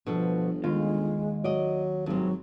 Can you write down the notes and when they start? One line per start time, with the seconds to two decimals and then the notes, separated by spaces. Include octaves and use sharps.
0.06 G1 B2 F3 A4
0.64 D#2 G#3 F4
1.44 F#3 D5 D#5
2.06 G#1 G2 C3 F#3